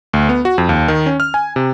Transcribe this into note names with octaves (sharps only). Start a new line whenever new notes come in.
D2
B3
F#4
F2
D#2
D#3
C#4
F6
G#5
C3